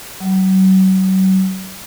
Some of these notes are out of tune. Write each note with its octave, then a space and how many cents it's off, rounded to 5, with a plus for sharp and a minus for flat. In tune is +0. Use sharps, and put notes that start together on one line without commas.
F#3 +40